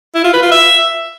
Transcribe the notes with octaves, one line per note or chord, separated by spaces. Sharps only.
E4
F4
B4
F4
E5